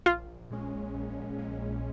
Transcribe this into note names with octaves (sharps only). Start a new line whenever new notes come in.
A#1 F4
A#2 G#3 C#4
A#1
A#2 G#3 C#4